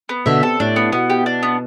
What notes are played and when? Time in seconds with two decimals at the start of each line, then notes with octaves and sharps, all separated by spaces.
0.09 B3
0.26 B2 D3 E5
0.43 C3 A4
0.60 A2 D4
0.76 B3
0.92 B2 B3
1.10 G4
1.26 D4
1.43 B3